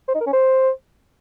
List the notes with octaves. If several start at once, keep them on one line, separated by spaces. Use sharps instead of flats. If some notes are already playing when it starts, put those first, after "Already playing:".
C5
D#4
A#4
C#4
C5